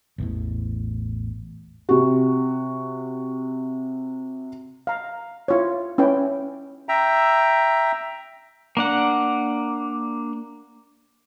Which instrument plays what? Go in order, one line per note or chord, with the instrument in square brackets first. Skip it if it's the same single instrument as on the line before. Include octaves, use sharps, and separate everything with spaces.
[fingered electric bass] A1 E2 A2
[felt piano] C3 F#4
[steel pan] F5 A#5
E4 F4 C#5
C#4 E4 B4 G5
[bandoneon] E5 G5 A#5
[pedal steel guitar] A#3 D4 F#5